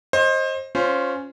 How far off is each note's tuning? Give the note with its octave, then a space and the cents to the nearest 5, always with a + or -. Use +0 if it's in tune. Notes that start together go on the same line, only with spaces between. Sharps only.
C5 +25 D#5 +5
C#4 +0 F4 +10 C5 -15